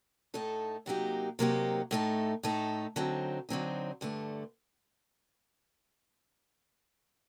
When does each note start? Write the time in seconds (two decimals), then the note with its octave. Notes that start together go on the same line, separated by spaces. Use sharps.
0.34 A2 A3 D#4 A4
0.86 C3 F#3 A#3 D#4 G4
1.39 C3 F#3 A#3 D#4 G4
1.91 A2 A3 D#4 A4
2.43 A2 A3 D#4 A4
2.96 D3 F#3 C4 D#4
3.49 D3 F#3 C4 D#4
4.01 G2 D3 A3